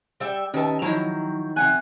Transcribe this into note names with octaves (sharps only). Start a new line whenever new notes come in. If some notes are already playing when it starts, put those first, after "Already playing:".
G3 E5 G5
D#3 C#4 G4 B4 D#5 E5 A5
D#3 F3 F#3 D#4 E4 A#5
C3 F#5 G#5 F#6